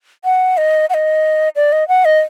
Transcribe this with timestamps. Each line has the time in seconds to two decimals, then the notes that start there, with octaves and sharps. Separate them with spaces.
0.25 F#5
0.57 D#5
0.90 F#5
0.94 D#5
1.56 D5
1.72 D#5
1.88 F#5
2.05 D#5